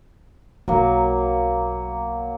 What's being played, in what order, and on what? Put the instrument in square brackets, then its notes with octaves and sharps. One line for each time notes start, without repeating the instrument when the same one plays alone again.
[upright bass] B1 [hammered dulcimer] F#3 A#3